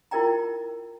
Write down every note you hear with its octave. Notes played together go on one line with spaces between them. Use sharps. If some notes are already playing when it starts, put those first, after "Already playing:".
E4 F4 A#4 D5 G5 A#5